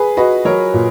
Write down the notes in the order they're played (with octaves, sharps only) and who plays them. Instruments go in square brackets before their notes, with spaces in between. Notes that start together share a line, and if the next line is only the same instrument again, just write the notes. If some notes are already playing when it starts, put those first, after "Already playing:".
Already playing: [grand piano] G#4 B4
[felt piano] F#4 [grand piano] B4 D#5
[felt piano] F#3 [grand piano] A#4 C#5
[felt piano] A#2